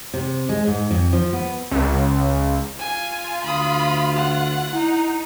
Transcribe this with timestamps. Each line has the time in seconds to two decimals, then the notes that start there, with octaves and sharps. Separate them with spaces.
0.14 C3
0.49 G#3
0.67 G#2
0.91 F2
1.13 F3
1.33 B3
1.71 C#2
2.79 F4 G#5
3.44 D2 B5 D#6
4.15 F#5
4.73 D#4 E4